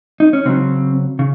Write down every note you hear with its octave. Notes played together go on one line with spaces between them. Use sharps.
D#4
C#4
C#3 F#3 C4
C#3